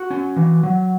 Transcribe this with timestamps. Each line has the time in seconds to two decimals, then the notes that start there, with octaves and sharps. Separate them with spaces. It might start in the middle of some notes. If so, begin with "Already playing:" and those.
Already playing: F#4
0.10 C#4
0.36 E3
0.63 F#3